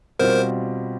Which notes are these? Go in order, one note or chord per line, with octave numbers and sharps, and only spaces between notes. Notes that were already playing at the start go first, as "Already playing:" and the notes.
B2 G3 C4 F4 A#4 C5